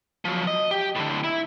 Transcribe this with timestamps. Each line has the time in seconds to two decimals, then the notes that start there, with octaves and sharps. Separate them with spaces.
0.25 F3 F#3
0.47 D#5
0.71 G4
0.96 A2 D3
1.24 E4